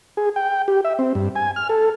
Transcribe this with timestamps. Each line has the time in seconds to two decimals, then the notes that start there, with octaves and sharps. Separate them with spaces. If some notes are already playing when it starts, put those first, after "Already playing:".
0.17 G#4
0.36 G5
0.68 G4
0.85 E5
0.99 C4
1.15 G2
1.36 G#5
1.56 F6
1.69 A4